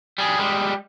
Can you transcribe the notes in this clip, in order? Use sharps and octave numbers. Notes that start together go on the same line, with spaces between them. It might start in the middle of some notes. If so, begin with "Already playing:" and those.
G3 G#4
G3 G#3